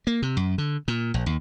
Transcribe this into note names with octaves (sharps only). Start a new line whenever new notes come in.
A#3
C3
F#2
D3
A#2
A#1
D#2